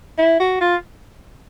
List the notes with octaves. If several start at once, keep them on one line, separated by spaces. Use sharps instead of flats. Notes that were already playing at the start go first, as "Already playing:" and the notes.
E4
F#4
F4